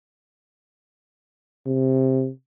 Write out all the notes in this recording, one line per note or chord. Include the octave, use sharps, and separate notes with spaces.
C3